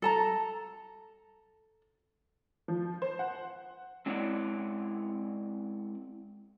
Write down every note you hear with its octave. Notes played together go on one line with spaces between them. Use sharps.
A4 A5 A#5
F3
C5
F#5
G#3 C4 E4 C#5 D5 F#5